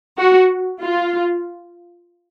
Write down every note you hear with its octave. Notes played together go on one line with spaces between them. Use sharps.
F#4
F4